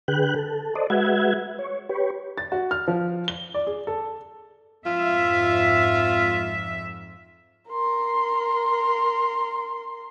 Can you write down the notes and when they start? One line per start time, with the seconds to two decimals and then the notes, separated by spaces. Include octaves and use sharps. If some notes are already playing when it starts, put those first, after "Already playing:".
0.08 D3 G#4 B4 G5 F#6
0.36 A4
0.75 A4 C5 D5 D#5
0.90 G#3 F#4 B4 E5 F#5 G#6
1.59 C#5
1.89 G4 B4 C#5
2.38 A6
2.52 F#4
2.71 F6
2.88 F3
3.28 G7
3.54 D5
3.67 G#4
3.87 A4
4.86 F2 G#2 F4 E5
7.69 A#4 C6